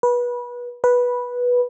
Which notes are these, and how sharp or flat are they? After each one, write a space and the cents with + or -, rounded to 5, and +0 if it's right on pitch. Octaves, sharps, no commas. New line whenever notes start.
B4 -25
B4 -10